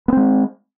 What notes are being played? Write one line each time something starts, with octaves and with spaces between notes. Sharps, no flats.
G#3 B3 C4